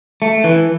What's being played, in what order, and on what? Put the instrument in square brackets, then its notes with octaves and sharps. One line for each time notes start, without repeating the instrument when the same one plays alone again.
[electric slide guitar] A3
E3